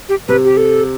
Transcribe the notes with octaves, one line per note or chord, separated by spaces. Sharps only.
G4
C3 B4
G4
A4